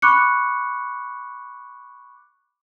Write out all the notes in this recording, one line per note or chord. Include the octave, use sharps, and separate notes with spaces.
B5 C#6 D6 F#6 C#7